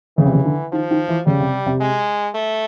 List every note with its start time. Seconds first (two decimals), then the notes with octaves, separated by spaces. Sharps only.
0.18 C#3 E3
0.25 C3
0.33 C#3
0.45 D3
0.72 D#3 F3
0.91 D#3
1.08 E3
1.27 C#3 G3
1.40 C3
1.66 C3
1.81 G#3
2.35 A3